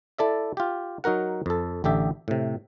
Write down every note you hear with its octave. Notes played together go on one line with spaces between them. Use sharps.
E4 A4 D5 E5
F4 G4
F#3 D#4 F#4 A#4 F#5
F2 A4
A1 D3 G4 E5
A2 C3